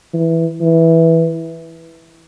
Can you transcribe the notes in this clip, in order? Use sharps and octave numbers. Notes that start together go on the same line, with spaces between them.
E3
E3